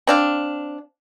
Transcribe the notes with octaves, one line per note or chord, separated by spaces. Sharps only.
C4 D4 F5